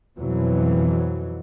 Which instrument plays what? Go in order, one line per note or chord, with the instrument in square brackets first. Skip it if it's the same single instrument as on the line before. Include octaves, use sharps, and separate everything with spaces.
[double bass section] F2 B2 E3 F#3